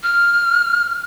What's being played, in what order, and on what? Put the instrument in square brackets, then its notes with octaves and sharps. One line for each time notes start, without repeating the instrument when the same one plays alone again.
[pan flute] F6